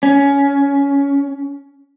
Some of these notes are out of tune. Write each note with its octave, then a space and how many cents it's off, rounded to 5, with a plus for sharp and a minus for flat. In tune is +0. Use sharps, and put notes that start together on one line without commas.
C#4 +15